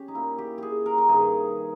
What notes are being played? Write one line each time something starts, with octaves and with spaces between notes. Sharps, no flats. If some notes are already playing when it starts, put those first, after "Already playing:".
Already playing: C#4 G4
D#4
A#2 E4
G4
G4 G#4
A#4
A#4
G2 D#3 G#4